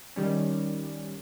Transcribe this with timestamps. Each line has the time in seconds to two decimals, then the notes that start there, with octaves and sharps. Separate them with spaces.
0.16 D#3 G3 C#4